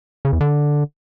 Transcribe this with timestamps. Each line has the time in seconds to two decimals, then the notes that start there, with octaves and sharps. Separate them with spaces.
0.25 C#3
0.33 E2
0.41 D3